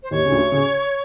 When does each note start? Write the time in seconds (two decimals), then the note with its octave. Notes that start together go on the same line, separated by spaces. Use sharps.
0.03 C5
0.11 D#2 D#3 C#5
0.25 C#3
0.32 D2 D3
0.52 C#3